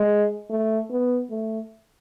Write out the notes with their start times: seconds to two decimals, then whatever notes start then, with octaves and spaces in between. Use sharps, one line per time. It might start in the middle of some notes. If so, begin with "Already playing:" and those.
Already playing: G#3
0.50 A3
0.90 B3
1.31 A3